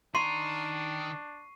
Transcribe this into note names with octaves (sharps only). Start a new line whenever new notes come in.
D#3 D4 A#5 C6 C#6 C7 D#7